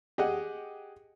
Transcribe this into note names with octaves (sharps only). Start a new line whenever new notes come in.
G4 G#4 D#5 F#5